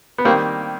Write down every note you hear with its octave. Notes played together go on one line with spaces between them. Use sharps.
B3
D#3 G3 A#3 C4